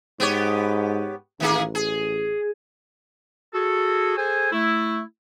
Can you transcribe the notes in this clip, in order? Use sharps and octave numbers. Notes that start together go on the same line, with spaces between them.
G#2 B3 G4 C#5
A1 D#3 A#3 G#4
G#4
F#4 G#4 A4
G#4 A4 C5 G#5
A3 E4